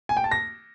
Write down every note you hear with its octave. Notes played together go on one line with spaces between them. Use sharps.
G#5
G5
A5
A#6